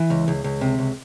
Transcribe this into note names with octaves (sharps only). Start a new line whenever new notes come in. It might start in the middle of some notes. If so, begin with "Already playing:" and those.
Already playing: E3
C#2
C#2
C#2
C3
C#2